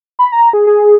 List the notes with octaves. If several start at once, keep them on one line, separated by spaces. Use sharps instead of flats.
B5
A#5
G#4
G#4